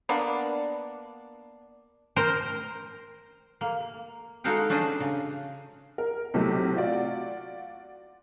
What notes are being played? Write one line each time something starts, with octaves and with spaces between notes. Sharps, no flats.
A#3 B3 D4
A#4 C5
A#3
G#3 D#4 F#4 A4 F5 G5
C#4 D4 C5 D5 D#5
C#3
A#4
B1 C3 E3 A3
F4 F#4 D5